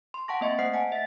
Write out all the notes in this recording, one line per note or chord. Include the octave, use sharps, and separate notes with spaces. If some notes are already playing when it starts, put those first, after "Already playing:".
C6
F#5 G5 A5 C#6 A#6
A#3 C4 D#5 E5 C#6 C#7
A3 C5 F#5 C7
D#5 F#5 G#5 A5
E5 B6